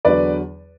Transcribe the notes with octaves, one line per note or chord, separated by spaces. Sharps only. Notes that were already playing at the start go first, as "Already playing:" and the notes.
E2 D3 F#3 B4 D5